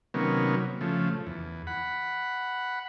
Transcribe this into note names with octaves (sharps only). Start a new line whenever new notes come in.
C3 D#3 F#3 A#3 B3 C#4
C#3 F3 A3
E2
F#5 B5